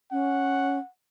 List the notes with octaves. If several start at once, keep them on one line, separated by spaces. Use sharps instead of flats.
C#4 F#5